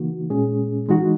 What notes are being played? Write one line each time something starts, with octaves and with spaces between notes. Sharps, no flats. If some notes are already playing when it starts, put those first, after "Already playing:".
Already playing: C#3 E3 A#3 D#4 F#4
A#2 G#3 C#4 G#4
E3 G#3 D#4 F#4